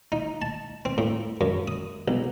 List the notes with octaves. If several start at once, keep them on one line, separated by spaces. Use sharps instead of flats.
D#4
A5
C4
A2
F#2
D#6
B1